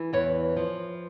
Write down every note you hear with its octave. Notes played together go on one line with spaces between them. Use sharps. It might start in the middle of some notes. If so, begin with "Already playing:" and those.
Already playing: E3
E2 B4 C#5
F3